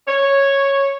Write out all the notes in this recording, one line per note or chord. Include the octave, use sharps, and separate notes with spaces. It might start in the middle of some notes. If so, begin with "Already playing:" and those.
C#5